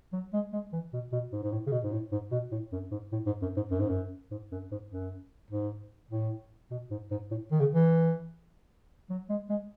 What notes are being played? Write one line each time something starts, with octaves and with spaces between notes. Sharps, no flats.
F#3
G#3
G#3
E3
B2
B2
G#2
G#2
A2
C#3
B2
G#2
A2
G#2
B2
A2
F#2
G#2
A2
G#2
F#2
G#2
F#2
G#2
F#2
G#2
F#2
G#2
F#2
G#2
A2
B2
G#2
G#2
A2
D#3
C#3
E3
F#3
G#3
G#3